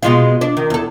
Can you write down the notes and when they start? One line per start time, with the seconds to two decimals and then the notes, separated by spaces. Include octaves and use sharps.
0.03 B2 G#3 F4
0.41 D4
0.57 D#3
0.70 E2 A4